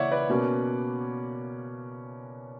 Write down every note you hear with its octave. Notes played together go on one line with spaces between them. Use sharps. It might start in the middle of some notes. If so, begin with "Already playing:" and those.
Already playing: C#3 E3 A#3 C#5 D5 E5 F#5
B4 D5
B2 A#3 C#4